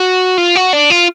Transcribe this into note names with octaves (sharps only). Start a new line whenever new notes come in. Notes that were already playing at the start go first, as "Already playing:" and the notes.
Already playing: F#4
F4
F#4
D4
F4